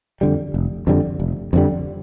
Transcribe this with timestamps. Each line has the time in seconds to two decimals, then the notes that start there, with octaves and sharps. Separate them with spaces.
0.21 F2 D3 G3
0.54 F1
0.87 F2 D3 G3
1.20 F1
1.53 F2 D3 G3